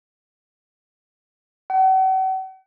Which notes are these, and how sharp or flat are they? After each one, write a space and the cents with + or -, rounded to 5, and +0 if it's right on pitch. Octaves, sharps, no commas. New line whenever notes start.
F#5 +40